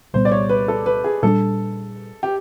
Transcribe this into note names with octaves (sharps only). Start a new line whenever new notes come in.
C2 A#2 G3 B3 C5
D5
C#5
B4
A4
B4
G#4
A#2 G3 B3 D4 A4
G4